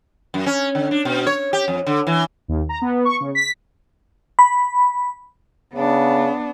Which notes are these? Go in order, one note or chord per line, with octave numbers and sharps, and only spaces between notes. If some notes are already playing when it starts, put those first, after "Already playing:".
F#2
C#4
D3
D4
B2
C#5
G4
F2
D3
E3
D#2
A#5
B3
C#6
C#3
B6
B5
C#3 B3 D4